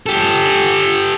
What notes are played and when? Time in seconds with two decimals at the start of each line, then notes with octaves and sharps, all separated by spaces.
0.06 G4 A4